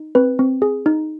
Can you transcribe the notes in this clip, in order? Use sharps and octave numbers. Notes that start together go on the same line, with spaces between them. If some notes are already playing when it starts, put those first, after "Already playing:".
Already playing: D#4
C4 B4
C4
G#4
D#4